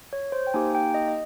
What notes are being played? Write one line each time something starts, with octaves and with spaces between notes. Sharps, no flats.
C#5
C5
G5
A#3 D#4 G4 G#5
G5
D#5
D#5